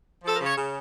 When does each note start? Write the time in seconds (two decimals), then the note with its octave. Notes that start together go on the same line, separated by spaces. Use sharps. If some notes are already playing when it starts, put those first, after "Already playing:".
0.24 F3 A4
0.35 A#4
0.41 C#3
0.47 C#5
0.57 C#3